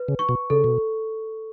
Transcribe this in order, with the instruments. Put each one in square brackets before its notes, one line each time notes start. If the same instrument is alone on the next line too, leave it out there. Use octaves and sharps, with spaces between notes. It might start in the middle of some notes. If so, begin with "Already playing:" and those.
Already playing: [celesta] B4
[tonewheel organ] C#3
[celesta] C#6
[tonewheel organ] B2
[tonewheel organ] C#3 [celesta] A4
[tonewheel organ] B2